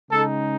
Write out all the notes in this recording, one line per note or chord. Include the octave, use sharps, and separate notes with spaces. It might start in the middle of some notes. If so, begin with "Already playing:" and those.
C#3 G#3 D#4 A4